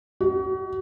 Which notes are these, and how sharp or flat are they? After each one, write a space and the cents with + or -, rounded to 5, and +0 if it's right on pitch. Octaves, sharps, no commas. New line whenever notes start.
F#4 +35